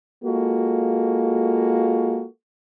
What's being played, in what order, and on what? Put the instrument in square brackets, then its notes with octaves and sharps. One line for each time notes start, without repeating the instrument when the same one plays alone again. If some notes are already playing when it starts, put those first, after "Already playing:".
[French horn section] G#3 A#3 F4 F#4 A4